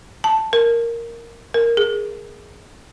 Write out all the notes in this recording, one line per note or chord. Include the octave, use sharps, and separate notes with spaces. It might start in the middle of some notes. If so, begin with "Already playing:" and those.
A5
A#4
A#4
G#4